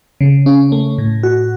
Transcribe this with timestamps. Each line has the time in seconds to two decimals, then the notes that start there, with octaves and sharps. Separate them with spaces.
0.21 C#3
0.46 C#4
0.72 A3
0.98 A2
1.23 F#4